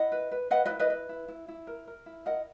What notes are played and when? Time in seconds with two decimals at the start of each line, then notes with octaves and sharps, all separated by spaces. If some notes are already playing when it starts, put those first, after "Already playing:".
Already playing: E4 D#5 F#5
0.12 B4
0.32 B4
0.51 B4 D#5 F#5
0.66 E4 B4 D#5
0.79 B4 D#5
0.90 B4
1.09 E4
1.28 E4
1.48 E4
1.67 A#4
1.87 A#4
2.06 E4
2.26 A#4 D#5 F#5